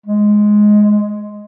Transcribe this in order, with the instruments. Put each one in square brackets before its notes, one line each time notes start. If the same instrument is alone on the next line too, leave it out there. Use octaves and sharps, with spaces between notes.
[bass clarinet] G#3